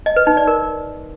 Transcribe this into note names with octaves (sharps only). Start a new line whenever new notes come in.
D#5
B4
D#4
D5
A#4